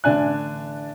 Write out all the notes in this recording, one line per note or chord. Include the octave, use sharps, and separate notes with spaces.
A1 D3 D4 G#5 F#6